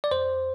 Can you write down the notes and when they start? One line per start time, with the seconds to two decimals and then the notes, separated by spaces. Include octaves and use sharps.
0.04 D5
0.11 F2 C5